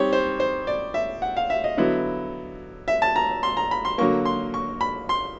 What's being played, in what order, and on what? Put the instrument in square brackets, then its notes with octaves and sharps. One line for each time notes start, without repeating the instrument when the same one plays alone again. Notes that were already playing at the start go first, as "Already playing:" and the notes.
Already playing: [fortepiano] G3 C4 D#4 C#5
C5
C5
D5
E5
F#5
F5
E5
D#5
D3 F#3 B3 E4
E5
A5
A#5
C6
A#5
B5
C6
D3 F#3 A#3 C#6
C6
C#6
B5
C6